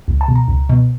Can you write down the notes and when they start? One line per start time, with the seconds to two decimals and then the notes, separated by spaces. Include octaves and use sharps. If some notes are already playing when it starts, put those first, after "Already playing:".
0.08 C#2
0.21 A5
0.28 B2
0.35 A#5
0.48 C#2
0.69 B2